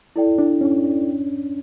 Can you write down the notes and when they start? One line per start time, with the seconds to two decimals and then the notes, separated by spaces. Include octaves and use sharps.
0.16 E4 A4 D5 G5
0.38 D4
0.61 C#4